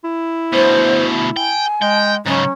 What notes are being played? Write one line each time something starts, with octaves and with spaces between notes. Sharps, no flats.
E4
D2 B2 C5
G5 G#5
G#3 G5
G#2 C#3 F#3 C#4